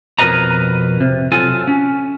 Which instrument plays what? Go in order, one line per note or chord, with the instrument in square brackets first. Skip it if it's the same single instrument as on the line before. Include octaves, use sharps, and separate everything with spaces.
[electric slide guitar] F2 B2 A#4 B4 D#5 A#5
C3
F#3 F4 A4 G#5
C#4